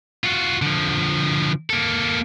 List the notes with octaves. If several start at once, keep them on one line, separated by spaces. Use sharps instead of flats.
F4 F#4
D3 F3
A#3 A4